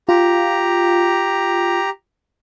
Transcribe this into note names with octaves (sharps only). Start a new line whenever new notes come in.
F4 G4 A#5